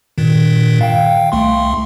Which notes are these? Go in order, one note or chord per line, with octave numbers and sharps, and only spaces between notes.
G2 A#2 D#3
F5 G5
C2 A3 C6